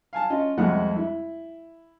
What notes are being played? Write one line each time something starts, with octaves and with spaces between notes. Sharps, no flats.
F5 G#5 A5
C#4 F4 D#5
C2 F2 F3 G#3 A3 F#5
E4